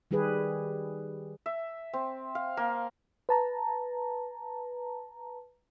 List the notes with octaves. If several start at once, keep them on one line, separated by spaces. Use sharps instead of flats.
D#3 G3 G4 G#4 B4
E5
C4
F5
A#3
B4 A5 A#5